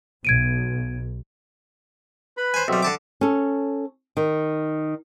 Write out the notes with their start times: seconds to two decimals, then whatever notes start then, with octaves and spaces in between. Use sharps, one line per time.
0.25 B1 G#6 D7 D#7
2.37 B4 B5
2.54 C5 G#5
2.68 B1 G3 C4 E5
2.83 D3 A5 D6
3.21 C#4 A4
4.17 D#3